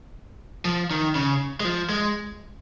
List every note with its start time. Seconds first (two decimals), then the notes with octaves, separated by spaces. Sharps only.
0.65 F3
0.91 D#3
1.15 C#3
1.60 G#3
1.65 F3
1.89 G#3